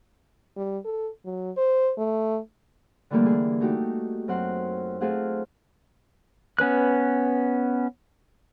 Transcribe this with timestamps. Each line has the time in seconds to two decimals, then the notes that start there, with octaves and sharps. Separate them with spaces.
0.57 G3
0.85 A4
1.25 F#3
1.57 C5
1.98 A3
3.10 D3 E3 G3 A3 A#3
3.26 G#4
3.61 A3 D#4 F#4 G4
4.28 F#2 C4 F#5 C6
5.01 A3 C4 F4 G#4 F5 F#5
6.59 B3 C#4 B4 F#6